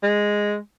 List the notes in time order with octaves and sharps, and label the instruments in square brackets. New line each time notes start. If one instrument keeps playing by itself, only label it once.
[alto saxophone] G#3